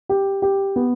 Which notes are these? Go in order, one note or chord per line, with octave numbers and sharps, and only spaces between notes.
G4
G4
B3